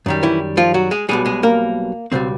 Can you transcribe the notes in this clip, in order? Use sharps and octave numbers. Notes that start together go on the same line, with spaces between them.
F#2 D#3 G3
E3 E4
F3 F4
F#3 F#4
G#3 G#4
B1 B2 G3 G#3 G#4
G#3 G#4
A#3 A#4
C#2 B2 G3 C4 C5